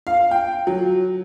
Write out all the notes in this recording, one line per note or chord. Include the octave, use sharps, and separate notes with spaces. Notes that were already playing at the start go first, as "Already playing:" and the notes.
F5
G5
F#3